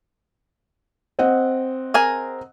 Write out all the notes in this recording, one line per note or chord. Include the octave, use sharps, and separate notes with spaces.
C4 D#5 F#5
G#4 A#4 G#5